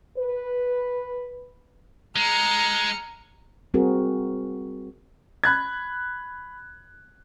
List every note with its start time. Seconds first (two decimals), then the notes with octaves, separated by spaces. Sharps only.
0.18 B4
2.16 G#3 A#5 F6 C#7
3.74 G3 C4 F#4 G#4 A#4
5.44 B5 F#6 G#6